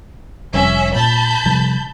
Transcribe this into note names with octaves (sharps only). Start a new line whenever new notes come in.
F1 F2 G3 C#4 E5
A#2 A5 B5 G6
C3 F3 G3